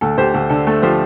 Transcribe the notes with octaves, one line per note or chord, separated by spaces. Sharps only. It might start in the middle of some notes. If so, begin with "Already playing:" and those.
D2 A4
D2 G4 C5
D2 A4
D3 A4
A3 A4
F3 G4 C5